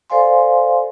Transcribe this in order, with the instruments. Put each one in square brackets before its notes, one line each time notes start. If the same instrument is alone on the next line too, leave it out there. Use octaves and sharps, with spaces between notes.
[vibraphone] A4 C5 D5 F5 G#5 C6